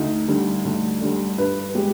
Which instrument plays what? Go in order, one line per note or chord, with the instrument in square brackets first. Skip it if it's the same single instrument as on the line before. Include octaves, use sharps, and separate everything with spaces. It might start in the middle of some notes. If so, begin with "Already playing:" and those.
Already playing: [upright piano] D2 D#4
D3 G3
D2
D3 G3
G2 B4
G#3 G4